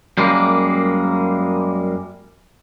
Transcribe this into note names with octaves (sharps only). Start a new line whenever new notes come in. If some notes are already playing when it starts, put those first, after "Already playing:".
F#2 G3 G#3 A#3